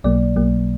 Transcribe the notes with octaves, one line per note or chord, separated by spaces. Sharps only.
B1 B2 F#3 A#3 D5
B1 B2 F#3 A#3